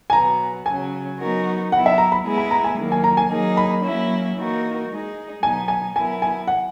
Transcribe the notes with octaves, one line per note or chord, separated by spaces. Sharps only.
G#5
B2 F#3 B3 A#5
C#3 F#3 C#4 G#5
F#3 B3 D#4 F#4 A#4
F#3 B3 E4 F#5
E5
A#5
B5
G#3 B3 E4 G#4
B5
A#5
G#5
D#3 F#3 A#3
G#5
A#5
G#5
F#3 A#3 D#4 G#4
B5
F#3 A#3 C#4 E4
E3 A#3 D#4 F#4 A#4
G#3 D#4 G#4
B2 F#3 B3 D#4 G#5
G#5
F#3 B3 E4 A#4 G#5
G#5
F#5